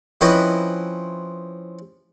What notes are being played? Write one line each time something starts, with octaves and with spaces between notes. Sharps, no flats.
F3 C4 C#4 E4 B4 D#5